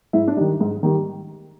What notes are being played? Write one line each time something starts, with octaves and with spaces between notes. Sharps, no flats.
G#2 E4
D4
D#3 G3 D#4
G#2
D#3 G3